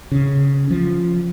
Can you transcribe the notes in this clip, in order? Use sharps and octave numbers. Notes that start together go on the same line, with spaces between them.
C#3
F3